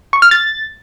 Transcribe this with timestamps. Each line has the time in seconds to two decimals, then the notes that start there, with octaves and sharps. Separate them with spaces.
0.13 C#6
0.22 F6
0.31 A6